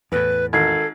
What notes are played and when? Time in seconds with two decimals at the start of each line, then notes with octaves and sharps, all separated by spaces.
0.12 E2 A2 B4
0.53 G#1 A4 G#6 C7